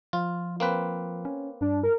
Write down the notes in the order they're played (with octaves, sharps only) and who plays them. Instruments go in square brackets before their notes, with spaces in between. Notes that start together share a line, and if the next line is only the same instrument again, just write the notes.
[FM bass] F3 [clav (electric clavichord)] F4
[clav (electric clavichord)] A#3 C4 B4
[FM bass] C#4
[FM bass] G2 [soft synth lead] D4
[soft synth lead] A#4